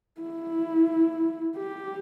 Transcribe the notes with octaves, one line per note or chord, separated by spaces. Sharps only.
E4
G4